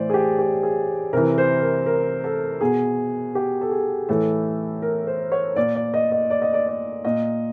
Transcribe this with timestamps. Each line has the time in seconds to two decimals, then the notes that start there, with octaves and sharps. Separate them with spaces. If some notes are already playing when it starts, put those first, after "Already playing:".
Already playing: A2 E3 C5 D5
0.09 G#4
0.14 G4
0.39 G4
0.63 G#4
1.13 C3 E3 A#4
1.38 C5
1.62 A#4
1.86 A#4
2.24 A4
2.61 B2 G#4
3.35 G4
3.61 A4
3.71 G#4
4.09 A2 E3 A4
4.82 A#4
5.07 C5
5.32 C#5
5.56 A#2 D5
5.75 D5
5.94 D#5
6.12 D#5
6.30 D5
6.42 D#5
6.54 D5
6.68 D5
7.04 A#2 D#5